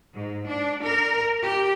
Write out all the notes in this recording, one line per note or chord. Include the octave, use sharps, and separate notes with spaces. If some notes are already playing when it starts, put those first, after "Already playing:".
G#2
D4
A#4
G4